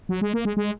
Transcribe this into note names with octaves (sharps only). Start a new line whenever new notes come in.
F#3
G#3
A#3
G#3
G#3